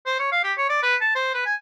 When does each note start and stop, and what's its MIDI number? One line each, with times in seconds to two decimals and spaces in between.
0.06 0.18 72
0.19 0.32 73
0.32 0.42 77
0.44 0.53 67
0.57 0.69 73
0.70 0.82 74
0.83 0.96 71
1.01 1.13 81
1.15 1.34 72
1.34 1.42 71
1.46 1.54 80